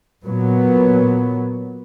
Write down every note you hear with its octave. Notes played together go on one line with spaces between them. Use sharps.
A#2 F#3 B3